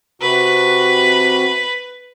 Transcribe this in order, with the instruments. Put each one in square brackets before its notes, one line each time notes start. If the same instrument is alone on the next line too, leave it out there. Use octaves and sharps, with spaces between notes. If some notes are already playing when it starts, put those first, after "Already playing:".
[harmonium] C3 F#4 [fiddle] B4